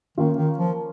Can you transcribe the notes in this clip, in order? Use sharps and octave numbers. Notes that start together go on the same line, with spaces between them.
D#3 A#3 C#4 F4
D#3
F3